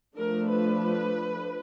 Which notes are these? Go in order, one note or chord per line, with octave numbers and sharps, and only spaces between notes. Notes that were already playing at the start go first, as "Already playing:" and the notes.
F3 A3 D4 A#4
B4